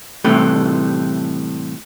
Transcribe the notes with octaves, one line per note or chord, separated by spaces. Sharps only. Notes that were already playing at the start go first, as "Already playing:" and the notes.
A2 C3 E3 G3 A3